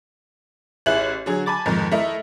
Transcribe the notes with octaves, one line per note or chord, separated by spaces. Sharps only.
A1 E4 G#4 F#6 F#7
D3 F#3 G#4
G#5 A5 B5 D6 A6
F2 G#2 D#3
A3 E4 A#4 D#5 E5